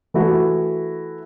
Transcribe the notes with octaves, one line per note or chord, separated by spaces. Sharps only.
E3 A3 E4 F#4